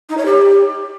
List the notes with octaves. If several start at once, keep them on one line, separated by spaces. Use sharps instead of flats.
D#4
C#5
G4